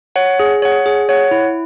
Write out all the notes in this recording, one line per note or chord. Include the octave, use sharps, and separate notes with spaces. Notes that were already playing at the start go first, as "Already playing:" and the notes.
C#5 F#5
G#4
C#5 F#5
G#4
C#5 F#5
E4